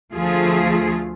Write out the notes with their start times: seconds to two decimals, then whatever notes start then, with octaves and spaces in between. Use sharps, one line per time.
0.14 D2 F3 A3 F4 G#4